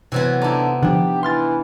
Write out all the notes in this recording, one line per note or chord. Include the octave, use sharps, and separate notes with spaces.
C3 E3 F#3 B3
D3 D#4 E4 D6
D3 F3 D4 G4
E3 C6 F6 A6